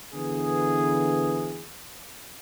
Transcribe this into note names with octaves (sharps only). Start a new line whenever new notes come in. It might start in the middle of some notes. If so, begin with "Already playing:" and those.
D3 E3 B3 G#4